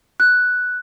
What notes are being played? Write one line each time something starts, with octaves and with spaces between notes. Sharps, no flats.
F#6